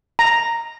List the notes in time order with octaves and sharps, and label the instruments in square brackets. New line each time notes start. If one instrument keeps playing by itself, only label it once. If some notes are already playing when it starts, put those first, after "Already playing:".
[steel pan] A#5